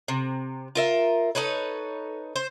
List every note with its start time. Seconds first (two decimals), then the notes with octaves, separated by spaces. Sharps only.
0.08 C3
0.75 F4 A#4 E5
1.35 D#4 A4 B4 C#5
2.36 C5